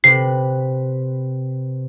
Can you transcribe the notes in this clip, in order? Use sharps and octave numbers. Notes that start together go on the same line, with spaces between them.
C3 B4 C7